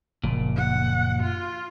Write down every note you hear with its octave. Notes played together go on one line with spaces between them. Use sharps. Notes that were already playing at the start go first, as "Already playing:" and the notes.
F#1 A#2 F3
F#5
F4